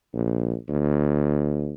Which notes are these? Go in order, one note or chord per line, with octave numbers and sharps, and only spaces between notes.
A#1
D2